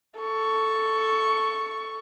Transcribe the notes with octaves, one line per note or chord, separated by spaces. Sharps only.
A4 C#6